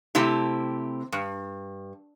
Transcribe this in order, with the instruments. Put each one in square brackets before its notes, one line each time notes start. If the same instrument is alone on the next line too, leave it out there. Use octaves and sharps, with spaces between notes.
[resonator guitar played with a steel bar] C3 A3 C4 E4 G4
G2